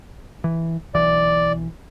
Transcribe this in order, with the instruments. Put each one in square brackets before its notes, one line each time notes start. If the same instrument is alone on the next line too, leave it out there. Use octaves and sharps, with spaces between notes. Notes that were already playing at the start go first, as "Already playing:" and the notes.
[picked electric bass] E3
[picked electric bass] B1 E3 [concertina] D5